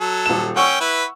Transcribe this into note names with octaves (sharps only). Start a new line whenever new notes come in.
F#3 A4
D#1 E7
C#4 F#5 G5 C#6 E6
E4 B4